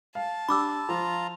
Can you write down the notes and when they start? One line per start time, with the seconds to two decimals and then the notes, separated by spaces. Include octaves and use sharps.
0.15 F5 A5
0.49 D4 G4 B5 D6 E6
0.89 F3 F4 A#5